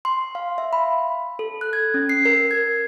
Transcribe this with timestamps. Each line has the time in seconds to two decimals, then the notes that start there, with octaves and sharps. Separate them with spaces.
0.05 C6
0.35 F5
0.58 E5
0.73 B5
1.39 A4
1.61 F#6
1.73 G#6
1.94 C#4
2.09 C7
2.25 A#4
2.51 G#6